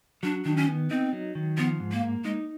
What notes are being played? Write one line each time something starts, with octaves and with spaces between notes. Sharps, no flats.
F#3 D4
D#3 D4
C#4
B3
C4 D#4
F#3
D#3
F3 B3
G#2
A#3
A#3
G#3 D#4